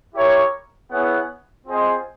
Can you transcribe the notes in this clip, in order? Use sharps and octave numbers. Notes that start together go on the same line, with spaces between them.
E4 G4 A#4 C#5
B3 E4 G#4 C#5 F#5
C4 F4 G#4 C5 D#5